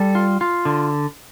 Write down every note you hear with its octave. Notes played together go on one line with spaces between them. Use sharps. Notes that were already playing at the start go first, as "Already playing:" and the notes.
Already playing: G3 A4
F4
F4
D3